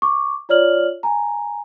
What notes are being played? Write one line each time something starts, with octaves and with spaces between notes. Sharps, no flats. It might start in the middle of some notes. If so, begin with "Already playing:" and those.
C#6 D6
F4 C#5 D5 F6 F#7
G#5 A#5